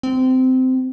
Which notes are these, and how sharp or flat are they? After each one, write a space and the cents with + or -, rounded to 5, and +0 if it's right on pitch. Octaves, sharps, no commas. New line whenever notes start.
C4 -20